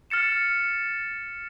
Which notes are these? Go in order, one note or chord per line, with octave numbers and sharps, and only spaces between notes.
F6 A6 C#7 E7